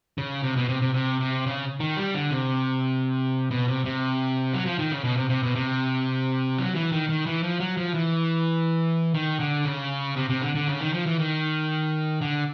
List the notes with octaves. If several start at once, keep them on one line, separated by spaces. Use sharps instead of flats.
C#3
C3
B2
C3
C3
C3
C3
C#3
D#3
G3
D3
C3
B2
C3
C3
F#3
F3
D#3
C#3
B2
C3
C3
B2
C3
F#3
E3
D#3
D#3
E3
F3
F#3
F3
E3
D#3
D3
C#3
C3
C3
D3
D3
C#3
D#3
F3
E3
D#3
D3